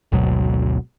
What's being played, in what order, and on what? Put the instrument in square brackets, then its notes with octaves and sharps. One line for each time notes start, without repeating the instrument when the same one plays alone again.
[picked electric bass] G#1 D2 B2 F#3